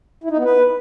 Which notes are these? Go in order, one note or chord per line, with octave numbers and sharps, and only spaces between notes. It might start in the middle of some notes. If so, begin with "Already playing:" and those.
E4
D#4
B3
B4